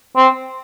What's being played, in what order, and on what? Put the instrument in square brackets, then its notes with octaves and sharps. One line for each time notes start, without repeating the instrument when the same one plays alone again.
[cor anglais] C4